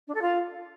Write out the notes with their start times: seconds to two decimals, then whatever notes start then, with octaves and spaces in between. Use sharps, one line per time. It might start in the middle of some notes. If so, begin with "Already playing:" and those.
0.07 D4
0.14 A4
0.21 F4